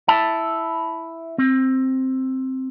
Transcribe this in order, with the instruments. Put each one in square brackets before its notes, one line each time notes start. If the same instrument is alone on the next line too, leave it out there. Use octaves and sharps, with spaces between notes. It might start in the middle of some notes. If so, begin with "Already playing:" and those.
[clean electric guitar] E4 A5
C4